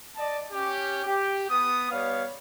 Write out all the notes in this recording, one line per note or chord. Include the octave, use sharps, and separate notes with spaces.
D5 D#5 A5
C#4 G4
G4
B3 D#6
G3 B3 C#5 F5